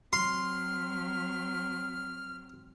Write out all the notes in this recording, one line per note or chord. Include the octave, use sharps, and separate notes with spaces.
F#3 C4 C6 F6